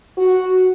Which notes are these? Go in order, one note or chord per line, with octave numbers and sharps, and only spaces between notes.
F#4